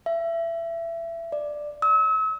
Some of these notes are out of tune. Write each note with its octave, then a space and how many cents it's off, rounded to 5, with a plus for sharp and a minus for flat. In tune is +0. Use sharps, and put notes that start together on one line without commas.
E5 +25
D5 +10
E6 -40